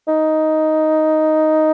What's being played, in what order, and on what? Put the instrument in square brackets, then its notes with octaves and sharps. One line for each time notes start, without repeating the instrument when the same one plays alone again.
[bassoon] D#4